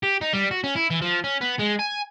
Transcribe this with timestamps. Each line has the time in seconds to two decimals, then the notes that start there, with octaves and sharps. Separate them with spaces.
0.03 G4
0.21 D#4
0.33 G3
0.51 F#4
0.64 C#4
0.76 E4
0.90 E3
1.02 F3
1.24 C#4
1.41 B3
1.59 G#3
1.79 G#5